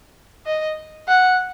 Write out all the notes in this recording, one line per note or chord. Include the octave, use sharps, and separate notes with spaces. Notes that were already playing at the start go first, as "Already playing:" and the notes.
D#5
F#5